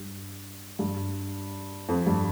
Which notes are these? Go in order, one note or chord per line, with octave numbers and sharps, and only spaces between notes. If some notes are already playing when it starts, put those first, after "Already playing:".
Already playing: G2
G2
F2
G2